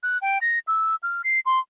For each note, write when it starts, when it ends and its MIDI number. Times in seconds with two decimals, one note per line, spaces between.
0.03 0.18 90
0.22 0.38 79
0.41 0.59 94
0.68 0.95 88
1.03 1.22 89
1.24 1.40 96
1.46 1.59 84